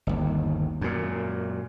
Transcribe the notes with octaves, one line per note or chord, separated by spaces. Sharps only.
G1 D#2
F#2 A#2